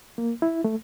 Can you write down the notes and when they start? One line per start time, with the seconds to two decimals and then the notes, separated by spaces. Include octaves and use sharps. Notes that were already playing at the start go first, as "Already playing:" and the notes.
0.18 A#3
0.42 E4
0.64 A3